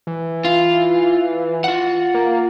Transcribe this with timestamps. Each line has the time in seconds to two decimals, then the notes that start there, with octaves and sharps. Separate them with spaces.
0.07 E3
0.45 F4
1.64 F4 F#5
2.14 A#3